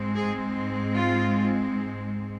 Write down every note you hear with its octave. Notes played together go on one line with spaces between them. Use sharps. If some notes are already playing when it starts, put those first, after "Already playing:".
Already playing: G#2 G#3 C4
G#4
F4